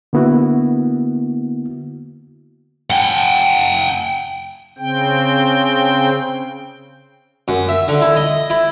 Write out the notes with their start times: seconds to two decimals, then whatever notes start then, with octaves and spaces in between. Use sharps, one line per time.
0.13 D3 A#3 B3 E4 F#4
2.90 F#5 G5
4.78 C#3 C4 G5
7.48 F#2
7.69 E5
7.88 D3
8.01 E4
8.16 D#5
8.50 E4